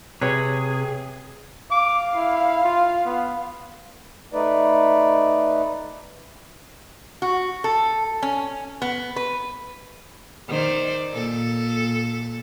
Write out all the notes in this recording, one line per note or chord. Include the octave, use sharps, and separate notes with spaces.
C3 G#4 B4 C#5
F5 D6
E4
F4
B3
A3 D#4 B4 D5
F#4
A4
C#4
B3
B4
D#3 C5 D5
A#2 A4